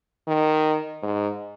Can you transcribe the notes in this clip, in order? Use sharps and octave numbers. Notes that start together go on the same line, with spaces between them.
D#3
G#2